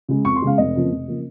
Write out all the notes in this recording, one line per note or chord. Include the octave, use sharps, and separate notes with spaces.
C#3 G#3
F2 C#6
C6
C#3 G#3 F5
F1 D#5
F2 C#3 F3 A#3
F1
C#3 F3 A#3